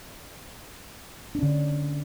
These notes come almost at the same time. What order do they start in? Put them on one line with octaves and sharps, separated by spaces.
D4 C#4 D3